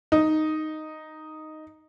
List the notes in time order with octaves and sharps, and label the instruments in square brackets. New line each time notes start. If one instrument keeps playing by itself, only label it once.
[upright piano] D#4